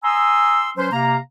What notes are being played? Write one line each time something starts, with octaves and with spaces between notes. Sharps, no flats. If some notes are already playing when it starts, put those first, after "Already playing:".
G#5 A#5 C6 D#6 E6
F#3 C#4 B4 C5
C3 A#3 F5 A#5